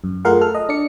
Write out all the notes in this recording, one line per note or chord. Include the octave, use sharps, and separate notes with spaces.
F#2
A3 F4 G#4 A#4 F5 F#5
A4 F6
D#5
D4 D5 C#7